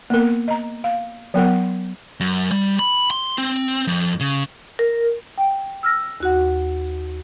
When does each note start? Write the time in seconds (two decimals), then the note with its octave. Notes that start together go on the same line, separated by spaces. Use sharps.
0.10 A#3 B3 A#4
0.48 D#5 A#5
0.84 F5
1.34 F#3 B3 A#4 F#5
2.20 F#2
2.52 G3
2.79 B5
3.11 C6
3.38 C4
3.87 F2
4.20 C#3
4.79 A#4
5.38 G5
5.83 E6 F6 A#6
6.20 D#2 F#4 F#5